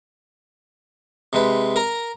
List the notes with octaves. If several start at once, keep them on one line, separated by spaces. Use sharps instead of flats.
C3 G#3 B4
A#4 A#5